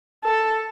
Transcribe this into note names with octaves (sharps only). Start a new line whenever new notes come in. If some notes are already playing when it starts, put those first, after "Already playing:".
A4